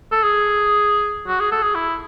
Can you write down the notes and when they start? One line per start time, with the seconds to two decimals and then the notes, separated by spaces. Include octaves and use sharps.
0.12 A4
0.23 G#4
1.28 F#4
1.40 G#4
1.52 A4
1.63 G#4
1.75 E4